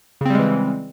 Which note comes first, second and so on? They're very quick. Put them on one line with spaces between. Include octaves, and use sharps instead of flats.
C#3 C4 G3 G#3 E3